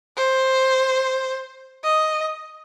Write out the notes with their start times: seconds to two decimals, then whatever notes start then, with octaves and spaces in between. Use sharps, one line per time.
0.17 C5
1.84 D#5